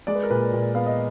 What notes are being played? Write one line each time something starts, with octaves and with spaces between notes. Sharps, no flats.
G#3 D5
B4
A#4
A#2 B4
A#2
B3 F5
D#5